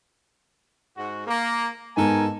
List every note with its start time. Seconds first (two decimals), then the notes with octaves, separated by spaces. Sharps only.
0.97 G#2 F#4
1.27 A#3
1.97 G#2 B3 A4 A#4 G#5